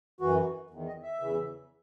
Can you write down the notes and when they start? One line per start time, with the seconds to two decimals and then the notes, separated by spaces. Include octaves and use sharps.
0.20 F#2 E3 F#4
0.70 E2 D#3
0.87 D#5
1.03 E5
1.20 E2 C#3 E3